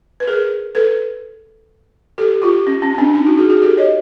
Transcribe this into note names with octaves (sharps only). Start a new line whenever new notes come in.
B4
G#4 A#4
A4 B4
G4 A4
F4 G4
C#4
C#4
C#4
C4 D4
C#4 D#4
E4 F#4
F#4 G#4
F#4 G#4
G4 A4
C#5 D#5